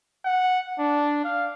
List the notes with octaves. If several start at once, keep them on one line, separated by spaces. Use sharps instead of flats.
F#5
D4
F5